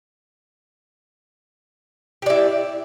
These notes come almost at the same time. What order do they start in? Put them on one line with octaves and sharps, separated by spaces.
G4 D5 E4